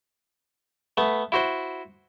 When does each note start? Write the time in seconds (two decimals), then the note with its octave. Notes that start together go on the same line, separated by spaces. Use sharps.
0.97 A3 B3
1.32 E4 F#4 C5